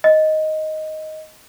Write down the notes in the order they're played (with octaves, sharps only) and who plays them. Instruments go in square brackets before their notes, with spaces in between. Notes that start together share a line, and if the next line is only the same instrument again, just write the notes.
[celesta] D#5